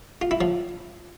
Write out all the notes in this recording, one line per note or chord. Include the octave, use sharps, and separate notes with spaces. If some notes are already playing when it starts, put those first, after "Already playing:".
F4
E4
F3